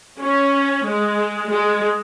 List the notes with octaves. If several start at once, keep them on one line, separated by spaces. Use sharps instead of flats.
C#4
G#3
G#3